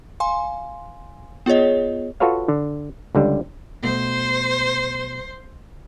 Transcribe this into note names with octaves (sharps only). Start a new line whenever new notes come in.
F5 G#5 C6
B3 F4 G#4 C#5 D#5
F4 F#4 A4 B4 C#5 F5
D3
C#2 D3 G3
B2 A3 C5